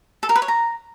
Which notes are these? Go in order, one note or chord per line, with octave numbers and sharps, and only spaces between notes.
A4
A#4
B4
C#5
A#5